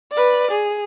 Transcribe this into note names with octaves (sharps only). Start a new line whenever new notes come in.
B4 D5
G#4